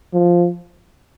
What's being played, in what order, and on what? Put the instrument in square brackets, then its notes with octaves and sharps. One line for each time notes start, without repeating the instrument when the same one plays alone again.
[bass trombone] F3